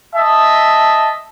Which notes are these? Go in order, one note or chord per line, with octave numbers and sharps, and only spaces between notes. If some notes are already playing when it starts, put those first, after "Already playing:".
D#5 E5 A5